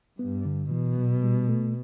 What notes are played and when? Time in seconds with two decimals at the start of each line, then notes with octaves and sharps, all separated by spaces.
0.19 G2 B3
0.45 D3
0.71 B2 E3
0.98 F#3
1.23 G3
1.49 A3